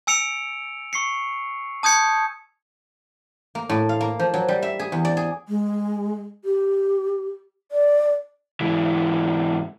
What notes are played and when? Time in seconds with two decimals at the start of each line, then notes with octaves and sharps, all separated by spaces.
0.07 G#5 E6 C#7 D7 F7
0.93 C#6 C7 C#7
1.83 A5 D#6 G6 G#6 C#7
3.55 A#3
3.69 A2
3.89 F5
4.01 A#3
4.19 F3
4.34 F#3
4.48 G3
4.62 E5
4.79 G#4
4.92 E2
5.05 D5
5.17 G#4
5.48 G#3
6.44 G4
7.72 D5
8.61 G#2 E3